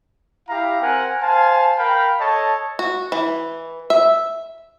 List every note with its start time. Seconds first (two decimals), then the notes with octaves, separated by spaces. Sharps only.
0.48 E4 G4 F5 A#5
0.80 C4 A#4 F#5 G#5
1.21 C5 F5 G#5 A5
1.78 A#4 F5 G5 B5
2.20 A4 C#5 D#5 A5
2.79 F#4
3.12 E3
3.90 E5